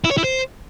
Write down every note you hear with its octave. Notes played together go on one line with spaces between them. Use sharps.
E4
C#5
E4
C5